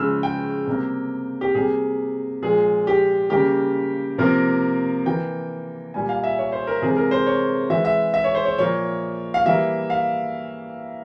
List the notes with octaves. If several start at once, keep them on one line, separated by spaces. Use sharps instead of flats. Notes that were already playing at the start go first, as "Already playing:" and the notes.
Already playing: C#3 F3 G#3 E6 F6
G5
C3 G3 A#3
G4
C3 G3 A#3 G#4
A#2 F3 G#3 G#4
G4
C#3 G3 A#3 G4
C3 F3 A#3 A#4
E3 A#3 G5
A#2 G3 A#3 G#5
F5
E5
C#5
C5
A#4
C3 E3 G#3 G#4
A#4
C5
C#5
E3 G#3 E5
E5
E5
C#5
C5
C#5
A#2 F3 A#3 C#5
F5
E3 G3 A#3 E5
F5